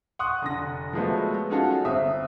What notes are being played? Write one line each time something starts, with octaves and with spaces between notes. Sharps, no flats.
F#5 C6 C#6 D#6 F#6
F1 D3 A#6
F3 F#3 G#3 A3 B3
C#4 D#4 F4 F#4 G#4 A4
G1 C4 E5 D#6